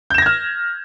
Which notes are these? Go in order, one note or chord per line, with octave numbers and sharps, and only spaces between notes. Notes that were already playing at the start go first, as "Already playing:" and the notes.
F6 G6 G#6 A#6 E7